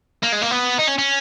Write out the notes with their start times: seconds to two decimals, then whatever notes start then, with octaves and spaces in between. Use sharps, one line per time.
0.23 A#3
0.32 G#3
0.42 A#3
0.51 B3
0.79 D#4
0.88 C#4
0.98 C#4